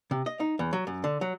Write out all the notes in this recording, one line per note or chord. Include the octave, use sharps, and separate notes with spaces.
C3
D#5
D#4
E2
F#3
F#2
D3
F#3